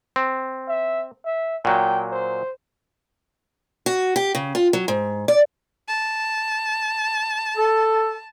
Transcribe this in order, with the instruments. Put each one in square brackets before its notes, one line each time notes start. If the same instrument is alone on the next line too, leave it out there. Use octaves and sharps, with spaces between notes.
[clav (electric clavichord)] C4
[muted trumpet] E5
E5
[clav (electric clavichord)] A#2 F#3 [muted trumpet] G5
[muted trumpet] C5
[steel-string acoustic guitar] F#4
G4
C#3
F4
F#3
G#2
D5
[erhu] A5
[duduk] A4